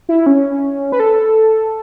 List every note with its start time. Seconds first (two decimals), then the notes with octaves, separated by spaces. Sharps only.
0.09 E4
0.26 C#4
0.92 B4
1.00 A4